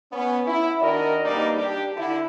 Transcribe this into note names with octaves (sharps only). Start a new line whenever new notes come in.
B3 C#4
E4
D#3 D4 F#4 A#4 D5 D#5
C3 G3 A#3 D#4 B4 D5
D4 G4
D3 E4